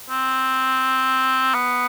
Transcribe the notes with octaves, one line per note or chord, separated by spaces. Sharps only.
C4
B3